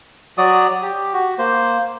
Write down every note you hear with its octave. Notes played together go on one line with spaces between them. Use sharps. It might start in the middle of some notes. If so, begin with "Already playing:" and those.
F#3 F#4 D5 D#6
G4
F#4
A#3 C5